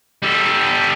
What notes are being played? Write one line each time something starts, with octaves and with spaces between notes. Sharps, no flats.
G3 A4